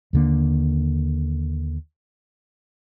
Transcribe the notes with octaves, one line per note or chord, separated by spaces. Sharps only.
D#2 D3 A#3